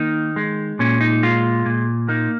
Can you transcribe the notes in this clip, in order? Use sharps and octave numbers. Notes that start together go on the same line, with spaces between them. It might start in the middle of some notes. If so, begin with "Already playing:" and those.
Already playing: D#3 A#3 D#4
G#3
A#2 C#4
D#4
G#3 F4
A#2
A#3 D#4